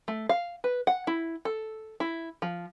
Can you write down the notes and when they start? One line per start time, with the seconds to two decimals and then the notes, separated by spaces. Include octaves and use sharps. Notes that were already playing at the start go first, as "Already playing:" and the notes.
0.08 A3
0.29 F5
0.64 B4
0.87 F#5
1.07 E4
1.45 A4
2.00 E4
2.42 F3